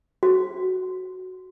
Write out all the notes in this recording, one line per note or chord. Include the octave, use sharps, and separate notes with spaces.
F#4